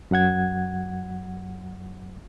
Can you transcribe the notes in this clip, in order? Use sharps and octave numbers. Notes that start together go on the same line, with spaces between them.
F#2 F#3 F#5 G#6